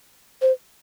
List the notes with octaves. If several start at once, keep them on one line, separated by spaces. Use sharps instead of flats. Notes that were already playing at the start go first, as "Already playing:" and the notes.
C5